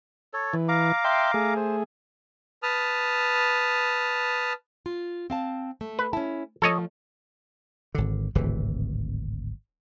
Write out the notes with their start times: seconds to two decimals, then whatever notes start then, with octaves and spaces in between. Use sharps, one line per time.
0.33 A4 C#5
0.53 E3
0.68 F5 A#5 D6
1.04 E5 G5 C6
1.34 A3 G#4
1.56 C5
2.63 B4 A5 D#6 F6
4.86 F4
5.30 C4 F5 A5
5.81 A3
5.99 B4
6.13 C#4 E4 A5
6.62 F3 A3 A4 C#5 D#5
7.95 G#1 D3
8.35 D1 G#1 C3 E3